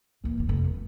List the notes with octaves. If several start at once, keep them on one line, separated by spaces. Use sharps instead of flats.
A#2 E3
F1 D#3
F1
G2